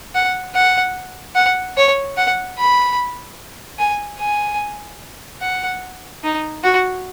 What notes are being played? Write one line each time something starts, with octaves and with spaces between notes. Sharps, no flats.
F#5
F#5
F#5
C#5
F#5
B5
G#5
G#5
F#5
D#4
F#4